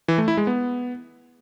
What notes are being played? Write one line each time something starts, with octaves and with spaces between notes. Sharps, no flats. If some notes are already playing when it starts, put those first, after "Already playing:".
E3
A3
E4
G#3
B3